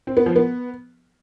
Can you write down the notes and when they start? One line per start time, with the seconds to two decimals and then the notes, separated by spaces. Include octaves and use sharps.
0.07 C4
0.17 B3
0.26 F3
0.36 B3